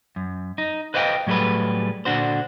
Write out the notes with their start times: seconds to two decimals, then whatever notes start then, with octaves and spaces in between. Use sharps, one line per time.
0.16 F#2
0.58 D#4
0.94 B4 C5 D#5 F5 G5
1.27 A2 F#3 G3 A3 G#4 B4
2.05 A#2 D3 D4 F#4 C5